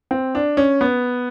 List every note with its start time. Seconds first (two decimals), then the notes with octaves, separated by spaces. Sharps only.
0.11 C4
0.35 D4
0.57 C#4
0.81 B3